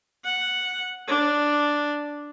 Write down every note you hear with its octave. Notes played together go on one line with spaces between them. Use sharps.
F#5
D4